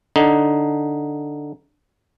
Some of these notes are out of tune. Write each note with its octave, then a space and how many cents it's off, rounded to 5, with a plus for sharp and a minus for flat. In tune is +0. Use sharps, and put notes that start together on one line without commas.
D3 +0 D#4 +0